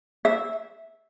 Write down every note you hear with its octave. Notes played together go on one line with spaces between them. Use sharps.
E5